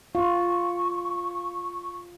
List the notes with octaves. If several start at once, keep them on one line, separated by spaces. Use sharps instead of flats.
F4 C#6